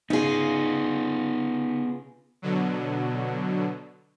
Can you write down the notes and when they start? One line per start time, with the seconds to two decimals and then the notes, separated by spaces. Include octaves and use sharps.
0.10 C#3 B3 D#4 F4 G#4
2.42 B2 D3 F#3